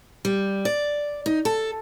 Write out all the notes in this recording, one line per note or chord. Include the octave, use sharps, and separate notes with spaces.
G3
D5
D#4
A4